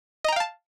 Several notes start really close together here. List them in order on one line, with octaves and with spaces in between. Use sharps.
D#5 A#5 G5 F5 A5